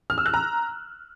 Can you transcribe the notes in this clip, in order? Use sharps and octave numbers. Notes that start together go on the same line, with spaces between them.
F6
E6
F#6
A#5